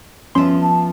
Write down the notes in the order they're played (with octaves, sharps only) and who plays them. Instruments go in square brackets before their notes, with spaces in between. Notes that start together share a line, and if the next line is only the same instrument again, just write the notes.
[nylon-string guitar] F3 B3 E5 [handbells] C#4 C6
[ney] A5